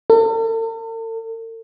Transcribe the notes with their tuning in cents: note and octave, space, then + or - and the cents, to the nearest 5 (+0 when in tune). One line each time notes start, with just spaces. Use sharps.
A4 +45